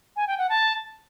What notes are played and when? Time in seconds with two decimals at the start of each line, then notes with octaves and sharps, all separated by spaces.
0.16 G#5
0.27 G5
0.38 F#5
0.49 A5